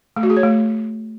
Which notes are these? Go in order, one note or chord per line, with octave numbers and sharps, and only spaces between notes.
A3
F#4
G#4
C#5
A3